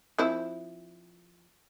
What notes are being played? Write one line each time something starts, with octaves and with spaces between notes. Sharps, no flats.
F3 C4 E4